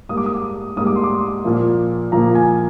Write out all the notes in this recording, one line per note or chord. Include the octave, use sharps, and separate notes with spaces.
G#2 G3 A#3 D#6
D6
D#6
G#2 G3 A#3 D#6
D6
C6
D6
A#2 F3 A#3
A#2 F3 A#3 A#5
G#5